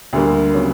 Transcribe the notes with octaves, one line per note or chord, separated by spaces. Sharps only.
D2 D3 G3 A#3
C#3 F#3 B3